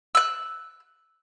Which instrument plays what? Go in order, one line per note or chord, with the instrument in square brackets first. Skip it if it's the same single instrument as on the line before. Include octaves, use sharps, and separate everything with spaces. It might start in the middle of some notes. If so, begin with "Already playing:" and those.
[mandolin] E6 F#6